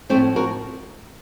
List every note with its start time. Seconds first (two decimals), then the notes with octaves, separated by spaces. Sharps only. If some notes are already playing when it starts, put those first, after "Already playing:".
0.09 F3 A3 C4
0.14 A2
0.36 F#4 A#4